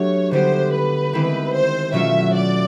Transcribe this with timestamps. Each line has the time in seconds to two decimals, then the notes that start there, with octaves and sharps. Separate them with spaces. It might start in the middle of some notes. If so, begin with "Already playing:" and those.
Already playing: F#3 A3 D4 G4 C#5
0.31 D3 G3 B3 E4 G4 C5
0.73 B4
1.13 D#3 G#3 C4 E4 G4
1.54 C5
1.92 B2 F#3 A3 C#4 F4 E5
2.35 D5